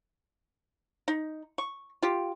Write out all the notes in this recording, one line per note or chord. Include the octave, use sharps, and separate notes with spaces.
D#4
C#6
F4 G4